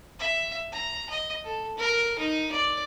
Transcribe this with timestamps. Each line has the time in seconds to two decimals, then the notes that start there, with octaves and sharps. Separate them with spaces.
0.19 E5
0.72 A#5
1.09 D#5
1.44 A4
1.77 A#4
2.18 D#4
2.52 D5